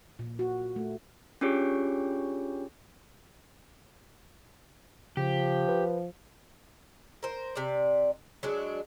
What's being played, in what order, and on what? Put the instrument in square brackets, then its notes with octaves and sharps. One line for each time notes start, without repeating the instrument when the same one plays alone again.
[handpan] A#2
F#4
A3
[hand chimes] C#4 D4 F4 G4 G#4 C#5
[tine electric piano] C#3 [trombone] F3 [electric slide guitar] G4
[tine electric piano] B4
[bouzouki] A#4 C5
C3 D5
F#3 G#3 D4